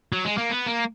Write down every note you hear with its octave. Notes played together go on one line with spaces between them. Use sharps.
F#3
G#3
A#3
B3
A#3